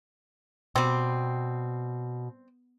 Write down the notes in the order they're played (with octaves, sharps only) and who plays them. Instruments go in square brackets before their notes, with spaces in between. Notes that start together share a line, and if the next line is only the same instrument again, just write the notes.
[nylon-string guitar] B2 [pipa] G3 C4